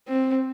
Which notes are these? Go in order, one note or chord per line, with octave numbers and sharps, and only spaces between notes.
C4